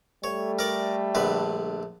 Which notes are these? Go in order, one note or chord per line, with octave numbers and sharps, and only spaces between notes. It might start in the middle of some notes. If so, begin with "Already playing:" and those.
G3 A3 C#5
A#4 D5
A#1 D3 B4